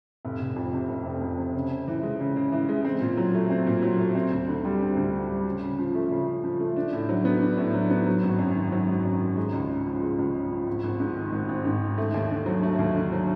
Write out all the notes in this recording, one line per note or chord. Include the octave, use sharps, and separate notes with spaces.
F1
F1
F2
C3
F1
F1
F2
C3
C#3
C#3
E3
G#3
C#3
C#3
E3
G#3
C4
A#2
F#3
A3
C4
A#2
F#3
A3
C4
D2
D3
G3
C4
D2
D3
G3
C#3
C#3
F3
A3
C#3
C#3
F3
A3
D4
A2
F#3
B3
D4
A2
F#3
B3
F#3
G#1
F#2
D#3
F#3
G#1
F#2
D#3
G#3
C#2
C#3
F3
G#3
C#2
C#3
F3
G#1
G#1
G#2
D#3
G#1
G#1
G#2
D#3
A3
D#2
D3
F#3
A3
D#2
D3
F#3